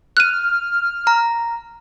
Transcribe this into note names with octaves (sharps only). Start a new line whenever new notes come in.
F6 F#6 D#7
A#5